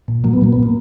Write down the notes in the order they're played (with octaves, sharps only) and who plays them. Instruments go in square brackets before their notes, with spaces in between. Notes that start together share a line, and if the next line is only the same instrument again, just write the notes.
[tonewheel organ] A#2
F#3 A#3
B3
A#2 A#3
B3
A#3